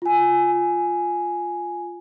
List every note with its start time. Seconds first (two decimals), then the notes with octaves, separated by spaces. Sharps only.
0.02 F4 G#5